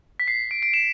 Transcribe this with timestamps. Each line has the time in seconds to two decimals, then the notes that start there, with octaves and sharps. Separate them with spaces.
0.20 B6
0.28 C7
0.51 D7
0.63 D7
0.74 E7